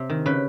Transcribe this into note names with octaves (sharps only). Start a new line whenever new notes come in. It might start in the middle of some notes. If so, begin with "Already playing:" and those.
Already playing: C3
D#3
C#3 B4